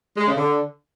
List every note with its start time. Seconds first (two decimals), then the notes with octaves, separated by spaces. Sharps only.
0.17 G#3
0.27 C#3
0.36 D3